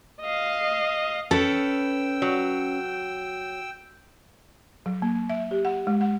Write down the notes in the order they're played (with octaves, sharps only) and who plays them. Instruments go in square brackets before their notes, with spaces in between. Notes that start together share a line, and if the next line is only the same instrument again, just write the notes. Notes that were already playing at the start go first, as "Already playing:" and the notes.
[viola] D#5 F5
[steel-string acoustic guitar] C#4 B4 [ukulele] A4 [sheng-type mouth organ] G5 E6
[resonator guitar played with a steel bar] F#3
[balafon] F#3
A#3
E5
G4
F#5
G#3
F#5